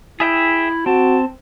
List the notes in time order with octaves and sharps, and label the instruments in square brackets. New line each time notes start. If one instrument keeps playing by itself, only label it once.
[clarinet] E4 [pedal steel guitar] G#4 E5 G5
[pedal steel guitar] C4 [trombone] F#4 [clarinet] A5